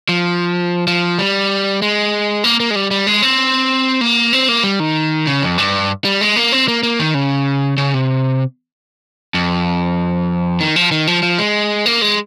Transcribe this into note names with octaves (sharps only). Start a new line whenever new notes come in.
F3
F3
G3
G#3
A#3
A#3
G#3
G3
G3
G#3
C4
A#3
C4
A#3
G3
D#3
C#3
F2
G2
G3
G#3
A#3
C4
A#3
A#3
D#3
C#3
C#3
C3
F2
D#3
F3
D#3
F3
F3
G#3
A#3
G#3